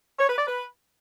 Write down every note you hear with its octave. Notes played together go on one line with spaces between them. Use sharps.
C#5
B4
D5
B4